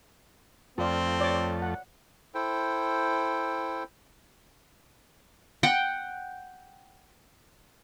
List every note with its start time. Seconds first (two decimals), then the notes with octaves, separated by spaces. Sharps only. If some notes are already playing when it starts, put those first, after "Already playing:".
0.78 F2 A3 C4 F4 D5
1.20 C#5 D5
1.62 F#5
2.34 E4 A4 C5 G5
5.63 F#5 G5